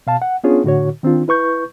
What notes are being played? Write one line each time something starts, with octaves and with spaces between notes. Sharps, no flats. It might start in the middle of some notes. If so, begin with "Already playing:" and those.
B2 F5 A5
F#5
B3 C#4 D4 F4 G#4 C#5
A2 D3 F#4 C#5
D#3 C4 D4 F4
E4 B4 C#6 G6